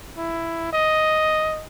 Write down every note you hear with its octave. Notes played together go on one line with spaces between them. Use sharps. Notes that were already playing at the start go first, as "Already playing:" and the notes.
E4
D#5